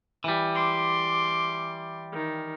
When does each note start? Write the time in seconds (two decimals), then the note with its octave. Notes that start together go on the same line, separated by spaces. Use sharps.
0.24 E3 G3
0.55 C6 D6
2.13 D#3